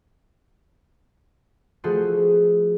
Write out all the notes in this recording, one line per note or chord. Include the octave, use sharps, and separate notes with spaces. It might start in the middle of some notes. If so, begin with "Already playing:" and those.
F3 A3 F#4 G#4 A4 C5